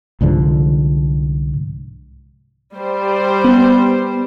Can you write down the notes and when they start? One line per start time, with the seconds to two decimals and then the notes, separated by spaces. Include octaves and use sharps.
0.21 C2 G#2 D3 F3
2.75 G3 C5
3.44 B3